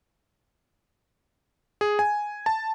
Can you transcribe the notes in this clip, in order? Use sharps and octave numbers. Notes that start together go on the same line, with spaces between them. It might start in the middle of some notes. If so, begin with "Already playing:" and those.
G#4
G#5
A5